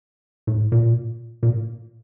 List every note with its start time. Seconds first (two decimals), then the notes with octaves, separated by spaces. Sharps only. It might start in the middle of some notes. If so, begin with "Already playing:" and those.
0.47 A2
0.72 A#2
1.43 A#2